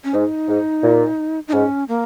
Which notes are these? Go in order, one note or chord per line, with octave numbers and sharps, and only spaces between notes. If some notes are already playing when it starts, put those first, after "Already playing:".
C#4
G#2 D#4
G#2
A#2
D#4
G#2 C#4
A#3